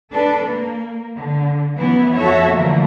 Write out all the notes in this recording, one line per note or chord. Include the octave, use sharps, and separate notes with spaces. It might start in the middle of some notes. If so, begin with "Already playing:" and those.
D4 A4 B4
A#3
D3
F#2 E3 B3 E4
F2 F#4 A4 C#5 E5
D3 E3 F3 A3 A#3